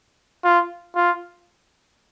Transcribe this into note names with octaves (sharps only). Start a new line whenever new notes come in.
F4
F4